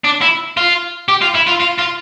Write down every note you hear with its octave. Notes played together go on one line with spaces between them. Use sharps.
D4
E4
F4
G4
F4
E4
F4
F4
F4